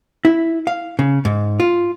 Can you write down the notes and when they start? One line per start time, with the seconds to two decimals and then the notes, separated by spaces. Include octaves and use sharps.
0.25 E4
0.67 F5
0.99 C#3
1.25 G#2
1.60 F4